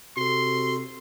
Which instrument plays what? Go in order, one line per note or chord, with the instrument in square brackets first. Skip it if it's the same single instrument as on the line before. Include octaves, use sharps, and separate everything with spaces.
[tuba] C3 [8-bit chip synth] F#4 A4 [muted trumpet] C6